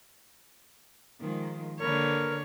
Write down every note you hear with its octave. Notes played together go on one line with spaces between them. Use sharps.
D#3 F3 G#3
D3 A#3 A#4 B4 C#5